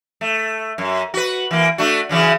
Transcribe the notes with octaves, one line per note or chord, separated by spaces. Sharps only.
A3
F#2
F#4 B4
E3 A#3
A3 D4 F#4
C#3 E3 F#3